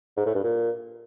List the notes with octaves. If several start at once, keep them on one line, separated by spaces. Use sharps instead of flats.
G#2
A2
G2
A#2